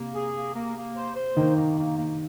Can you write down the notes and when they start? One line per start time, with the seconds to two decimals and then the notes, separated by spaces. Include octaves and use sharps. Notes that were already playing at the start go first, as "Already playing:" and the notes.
Already playing: C3 A#3
0.15 G#4
0.34 A#3
0.55 A#3
0.76 A#3
0.96 C5
1.15 C5
1.36 D#3 A#3
1.56 A#3
1.77 A#3
1.97 A#3